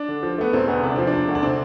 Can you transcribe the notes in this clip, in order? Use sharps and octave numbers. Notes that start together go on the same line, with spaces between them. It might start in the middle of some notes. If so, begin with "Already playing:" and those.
Already playing: D4
D3
F3
A3 B3
E1 C4
D2 B3
C3 D4
F3 C4
D4
E1
D2
D4
C3 C4